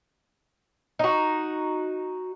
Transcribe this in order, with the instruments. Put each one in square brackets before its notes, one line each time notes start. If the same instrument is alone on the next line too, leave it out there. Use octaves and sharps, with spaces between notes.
[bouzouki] D#4 F#4